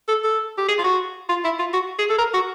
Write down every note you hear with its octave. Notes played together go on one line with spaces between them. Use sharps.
A4
A4
G4
G#4
F4
F#4
F4
E4
F4
F#4
G#4
A4
A#4
F#4